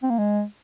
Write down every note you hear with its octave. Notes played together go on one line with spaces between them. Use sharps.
C4
A#3
G#3